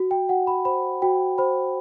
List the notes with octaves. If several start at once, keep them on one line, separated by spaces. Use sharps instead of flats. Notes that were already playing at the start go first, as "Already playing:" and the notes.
Already playing: F#4
G5
F#4 F#5
B5
C5 B5
F#4 G5
C5 B5